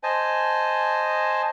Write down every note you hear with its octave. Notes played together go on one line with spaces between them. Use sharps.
C5 D#5 G#5 A5